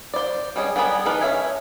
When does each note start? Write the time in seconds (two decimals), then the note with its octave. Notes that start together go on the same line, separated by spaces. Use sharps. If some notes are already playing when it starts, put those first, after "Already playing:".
0.14 C5 D5
0.56 G3 G#3 C#4 G#4
0.76 G3 B3 G#4 A#4 B5
1.06 E3 A3 D#4 A#4 B4
1.21 C#4 E5 G#5